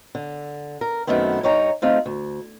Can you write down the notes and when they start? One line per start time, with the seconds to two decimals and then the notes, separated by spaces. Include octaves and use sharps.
0.15 D3
0.81 A#4
1.07 F#2 D#3 A3 B3 C4
1.43 G2 D#4 C#5 G5 A#5
1.82 A3 C4 D#4 F4
2.06 D2